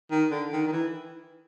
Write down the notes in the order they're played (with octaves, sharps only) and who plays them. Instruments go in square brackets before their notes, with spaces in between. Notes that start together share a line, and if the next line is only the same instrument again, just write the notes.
[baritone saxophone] D#3
D3
D#3
D#3
E3